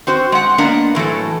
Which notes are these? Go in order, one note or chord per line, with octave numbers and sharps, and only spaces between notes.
C4 F#4 C5
G#3 F#5
A#3 B3 D4 D#5 F#5
A2 E3 F#3 A4